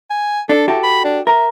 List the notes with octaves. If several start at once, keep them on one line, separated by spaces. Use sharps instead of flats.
G#5
D4 A4
E4 F#4 G4 A4
B5
D4
A#4 E5